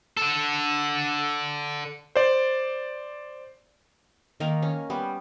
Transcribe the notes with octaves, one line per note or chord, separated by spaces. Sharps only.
D3 A4
C5 D5
D#3 A#3 A#4
C#4
G3 B3